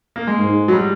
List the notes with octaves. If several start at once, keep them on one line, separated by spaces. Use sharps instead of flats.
A#3
G#3
G#2
F#3
G3